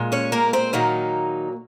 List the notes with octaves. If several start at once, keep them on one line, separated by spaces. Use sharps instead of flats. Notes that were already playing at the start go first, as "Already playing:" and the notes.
Already playing: A#2 G#3
C#4 C#5
A#3 A#4
C4 C5
A#2 D#3 F#3 A#3 D#4